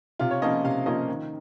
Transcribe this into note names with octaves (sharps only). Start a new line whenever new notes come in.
C3 F4
C#5
F3 A#3 C#4 D#5
C3 F5
F3 A#3 C#4 D#5
D#3